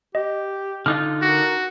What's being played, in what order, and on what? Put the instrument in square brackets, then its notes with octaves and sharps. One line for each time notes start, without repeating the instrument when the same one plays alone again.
[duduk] G4 [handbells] D#5
[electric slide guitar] D3 D#4 F4 [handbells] F6
[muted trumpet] F#4 [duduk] A#4